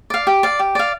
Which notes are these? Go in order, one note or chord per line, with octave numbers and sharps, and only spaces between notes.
D5 F5
G4
D5 F5
G4
D5 F5